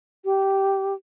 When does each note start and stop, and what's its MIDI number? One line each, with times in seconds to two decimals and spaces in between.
0.25 0.94 67